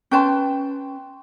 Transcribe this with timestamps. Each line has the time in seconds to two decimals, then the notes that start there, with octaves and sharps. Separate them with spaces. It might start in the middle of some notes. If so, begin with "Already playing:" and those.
0.11 C#4 B4 G5 A5 C6